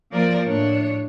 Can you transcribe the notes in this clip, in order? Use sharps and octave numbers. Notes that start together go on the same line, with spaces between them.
F3 A#3 A#4 D5
A2 D4 C#5